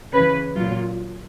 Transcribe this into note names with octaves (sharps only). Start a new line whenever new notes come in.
C#3 E3 B4
A#2 F#3 F4